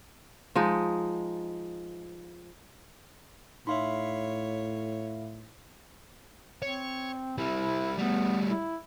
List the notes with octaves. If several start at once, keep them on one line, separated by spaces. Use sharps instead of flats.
F3 G#3 D#4
A2 D#4 C#5 E5 F5 B5 C6
C4 C#5
G3 C4 E4
G3 A3 B3
E4